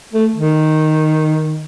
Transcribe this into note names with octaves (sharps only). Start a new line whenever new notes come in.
A3
D#3